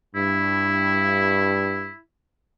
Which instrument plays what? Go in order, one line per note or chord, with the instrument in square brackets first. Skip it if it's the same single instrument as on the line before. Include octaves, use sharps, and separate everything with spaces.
[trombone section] G2 [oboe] E4